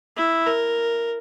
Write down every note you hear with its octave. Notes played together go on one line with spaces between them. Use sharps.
E4
A#4